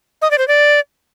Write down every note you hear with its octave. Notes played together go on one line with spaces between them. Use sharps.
D#5
D5
C5
D5